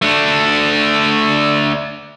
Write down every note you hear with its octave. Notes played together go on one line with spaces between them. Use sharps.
A3 D4